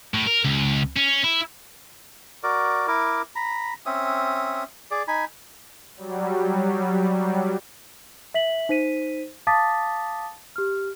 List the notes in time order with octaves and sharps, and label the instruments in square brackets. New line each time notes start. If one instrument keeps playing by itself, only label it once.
[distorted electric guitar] A2
A#4
C#2
C#4
E4
[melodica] F#4 A#4 D5
E4 A#4 D6
A#5 B5
C4 C#4 E5 D#6
G#4 D5
D#4 G#5 B5
[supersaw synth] F#3 G3
[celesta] E5 B6 F#7
D#4 C5 B6 D#7
F5 A5 D6 D#6 A6 B6
G4 F6